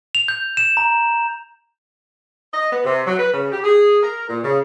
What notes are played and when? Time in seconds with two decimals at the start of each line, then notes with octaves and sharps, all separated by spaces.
0.15 F7
0.28 G6
0.57 E7
0.77 A#5
2.53 D#5
2.71 B3
2.84 C3
3.06 F#3
3.19 B4
3.32 C#3
3.51 G4
3.64 G#4
4.02 A#4
4.28 A#2
4.43 C#3